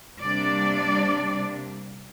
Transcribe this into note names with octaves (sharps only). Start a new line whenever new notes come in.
C3 G3 A#3 D4 D5